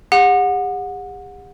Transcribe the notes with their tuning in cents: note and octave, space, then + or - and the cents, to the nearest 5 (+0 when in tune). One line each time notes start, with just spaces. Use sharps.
G4 +45 F#5 -25